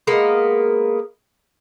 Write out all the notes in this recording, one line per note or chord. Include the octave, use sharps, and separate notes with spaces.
G#3 A#3 B3 A#4